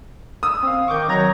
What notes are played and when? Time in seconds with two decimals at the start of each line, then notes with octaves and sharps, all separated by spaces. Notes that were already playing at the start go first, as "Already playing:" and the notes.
0.43 D#6 E6
0.63 C4 F5
0.88 D#3 C#6 D6 G6
1.09 F#3 A#5 G#6 A#6